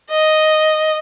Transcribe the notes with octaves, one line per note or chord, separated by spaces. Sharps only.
D#5